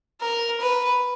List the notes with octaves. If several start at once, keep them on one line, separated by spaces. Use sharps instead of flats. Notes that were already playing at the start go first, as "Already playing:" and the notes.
A#4
B4